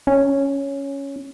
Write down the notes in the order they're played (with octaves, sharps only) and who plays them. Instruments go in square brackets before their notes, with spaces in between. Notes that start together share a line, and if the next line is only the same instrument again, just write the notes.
[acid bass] C#4